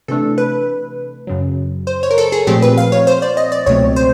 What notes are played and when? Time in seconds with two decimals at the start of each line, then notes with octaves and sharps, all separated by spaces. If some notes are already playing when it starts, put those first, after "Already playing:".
0.08 C3 E3 A3 D4 A4
0.38 B4
1.27 F#2 C#3 F#3
1.87 C5
2.03 C#5
2.11 A#4
2.18 A4
2.32 G#4
2.47 A#2 F3 A3 C4 G4
2.62 B4
2.78 F5
2.92 C#5
3.07 C5
3.22 D5
3.37 D#5
3.52 D5
3.66 C#2 B2 F#3 A3 C4 C#5
3.96 C5